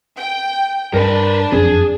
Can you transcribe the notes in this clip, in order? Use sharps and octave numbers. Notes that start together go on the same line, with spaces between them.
G5
G2 D4 A#4 B4
F#1 F2 C4 G#4